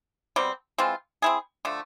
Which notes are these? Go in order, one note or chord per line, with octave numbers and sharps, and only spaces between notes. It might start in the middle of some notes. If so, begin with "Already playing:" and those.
B2 G3 C4
E3 G#3 C4 F4
C4 E4 G#4
D3 F3 A3